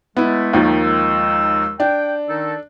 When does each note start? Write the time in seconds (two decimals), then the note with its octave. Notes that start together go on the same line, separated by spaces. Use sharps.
0.17 G#3 A3 B3 E4
0.53 D#2 D#3 F3
0.81 G#3 D#4 E6
1.80 D4 G5
2.29 D#3 D#4 A4